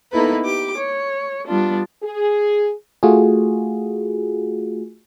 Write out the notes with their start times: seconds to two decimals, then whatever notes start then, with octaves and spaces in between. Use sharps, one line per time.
0.12 A#3 B3 D#4 E4 A4 B4
0.43 G4 D6
0.76 C#5
1.46 G3 B3 D4 F4
2.03 G#4
3.03 A3 F4 F#4 G#4